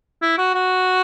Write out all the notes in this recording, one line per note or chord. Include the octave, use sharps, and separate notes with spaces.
E4
F#4
F#4